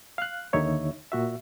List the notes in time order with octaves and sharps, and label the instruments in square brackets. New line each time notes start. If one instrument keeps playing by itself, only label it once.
[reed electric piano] F5 F#6
D#2 D3 D#4 C#5 E5
A#2 F#4 E5